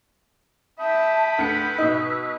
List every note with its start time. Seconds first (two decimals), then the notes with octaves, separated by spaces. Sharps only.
0.79 E5 G5 A5 B5 D#6
1.39 D2 B4 C#7
1.78 B2 D#4 E6